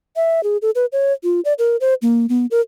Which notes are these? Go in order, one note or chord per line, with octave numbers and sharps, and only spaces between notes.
E5
G#4
A4
B4
C#5
F4
D5
A#4
C5
A#3
B3
A#4